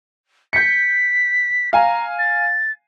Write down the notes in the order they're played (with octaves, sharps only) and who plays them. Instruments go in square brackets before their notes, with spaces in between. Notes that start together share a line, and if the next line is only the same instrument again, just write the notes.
[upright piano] G6 C#7 [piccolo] B6
[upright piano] F5 G#5 [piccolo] A#5
[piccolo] A6